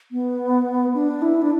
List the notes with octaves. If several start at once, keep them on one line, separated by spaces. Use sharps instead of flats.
B3
D4
E4
D4